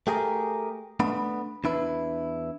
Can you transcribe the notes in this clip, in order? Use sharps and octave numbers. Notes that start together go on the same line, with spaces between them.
A3 G4 G#4 A#4
A3 B3 D4 B5
E2 D4 E4 B4